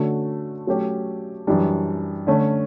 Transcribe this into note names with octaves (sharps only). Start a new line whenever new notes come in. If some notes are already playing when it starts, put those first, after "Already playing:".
Already playing: D3 A3 C#4 F#4 A4
F#3 A3 C#4 G4
F#2 E3 G3 D4
D3 A3 C#4